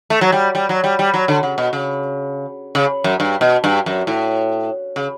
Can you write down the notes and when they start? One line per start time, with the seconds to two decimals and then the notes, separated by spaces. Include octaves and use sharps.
0.10 A3
0.21 F#3
0.32 G3
0.55 G3
0.69 F#3
0.84 G3
0.99 G3
1.14 F#3
1.28 D3
1.43 C#3
1.58 B2
1.73 C#3
2.75 C#3
3.04 F#2
3.20 G2
3.41 B2
3.64 G2
3.86 F#2
4.07 A2
4.96 C#3